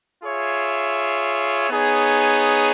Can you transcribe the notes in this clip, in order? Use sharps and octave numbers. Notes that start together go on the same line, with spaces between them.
F4 G#4 C#5 E5
B3 D#4 G#4 C#5